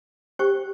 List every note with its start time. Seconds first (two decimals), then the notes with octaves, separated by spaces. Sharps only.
0.39 G4 C5 G5 C#6